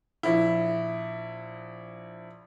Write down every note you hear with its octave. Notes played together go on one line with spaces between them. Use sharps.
A#1 E4